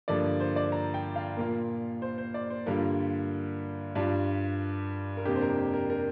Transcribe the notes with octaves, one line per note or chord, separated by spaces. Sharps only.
G2 D3 F3 A#3 D5
C5
D5
A#5
G5
F5
A#2 A#3 F4 A#4
C5
C5
D5
C5
G2 D3 G3 A#3 F4 A#4
G2 G3 D4 F4
A#4
F2 C3 A#3 D4 G4
C5
A#4
G4
A#4
A#4